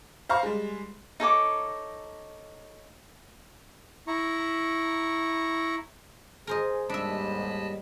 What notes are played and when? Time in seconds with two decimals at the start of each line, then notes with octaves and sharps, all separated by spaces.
0.29 C5 F5 A#5 C#6
0.43 G3 G#3
1.20 D#4 A4 C#5 D6
4.07 E4 A#5 C#6
6.47 G#4 A#4 C5 D#5
6.89 D#2 G#2 G3 D4 D#5 E5 A5 B5